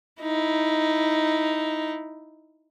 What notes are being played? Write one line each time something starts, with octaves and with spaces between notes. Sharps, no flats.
D#4 E4